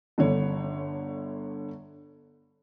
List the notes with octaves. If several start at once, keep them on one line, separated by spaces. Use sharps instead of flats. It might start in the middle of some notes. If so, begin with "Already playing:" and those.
G1 D3 C#5